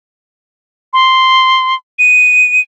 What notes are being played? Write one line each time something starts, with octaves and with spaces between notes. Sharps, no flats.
C6
D#7